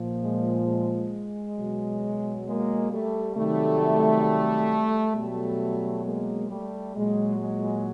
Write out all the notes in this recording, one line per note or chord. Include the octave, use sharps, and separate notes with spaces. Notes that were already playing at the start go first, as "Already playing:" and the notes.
Already playing: A#2 F3
G#3
G#3
B2 F#3
G#3 A#3
G3 A3
C3 D#3 F#3 G3 A3
B2 F#3 G3 A3
G#3 A#3
G3 A3
A#2 F#3 G#3
G#3